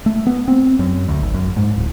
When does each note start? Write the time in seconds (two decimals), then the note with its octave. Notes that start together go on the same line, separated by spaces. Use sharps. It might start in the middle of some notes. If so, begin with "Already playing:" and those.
0.06 A3
0.27 B3
0.48 C4
0.79 F#2
1.08 D2
1.22 G#1
1.34 F#2
1.57 G#2
1.76 D1